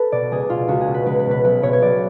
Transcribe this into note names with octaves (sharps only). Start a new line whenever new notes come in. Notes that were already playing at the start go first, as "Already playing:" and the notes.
Already playing: A4 B4
B2 D5
C#2 G#4
B2 F4
C#2 F#4
G#4
B2
B4
C#2 B4
B4
B2
B4
B1 B4
B2 C#5
C#5
B1 D5